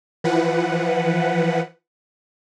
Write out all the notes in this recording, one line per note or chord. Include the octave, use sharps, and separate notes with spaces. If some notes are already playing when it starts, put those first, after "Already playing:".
E3 F3 B4 F#5